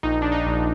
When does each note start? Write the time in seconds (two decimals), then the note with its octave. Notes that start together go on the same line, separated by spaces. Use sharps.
0.03 A#1 D#4
0.22 D4
0.32 D#4
0.46 A#1